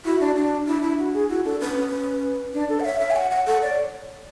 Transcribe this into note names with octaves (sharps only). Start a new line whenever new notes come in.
E4 F#4
D4
D4
D4 E4
E4
F#4
G#4
E4 F#4
D4 A4
C#4 B4
C#4
D4
A4
F#5
C#5 E5
E5
G#5
F#5
F#5
A4 F#5
C#5 D5